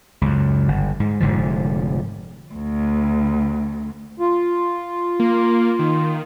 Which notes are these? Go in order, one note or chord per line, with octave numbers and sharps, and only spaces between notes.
C#2 F#2
G1
G#2
F1 G#2 D3 F3
D2
F4
A#3
D#3